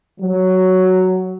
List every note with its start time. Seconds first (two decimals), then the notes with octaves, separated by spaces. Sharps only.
0.20 F#3